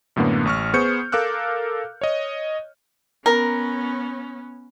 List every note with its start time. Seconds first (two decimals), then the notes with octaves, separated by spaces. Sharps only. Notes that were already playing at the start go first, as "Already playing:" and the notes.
0.16 F#2 A2 D3 A#3 B3
0.45 A1 C#6 F6
0.74 B3 G#4 C5 C#6 G6 C#7
1.12 A4 A#4 F5 D6 E6 F#6
2.01 C#5 D#5
3.26 B3 C#4 A#4